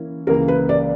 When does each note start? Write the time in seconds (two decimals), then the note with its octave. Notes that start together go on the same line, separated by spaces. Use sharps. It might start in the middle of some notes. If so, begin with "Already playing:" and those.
Already playing: E3 A#3 C#4 E4
0.27 C#2 C#3 E3 A#3 A#4
0.48 B4
0.69 D5